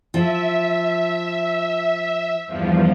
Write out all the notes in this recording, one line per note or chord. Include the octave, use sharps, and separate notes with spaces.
F3 E5
E2 G2 F3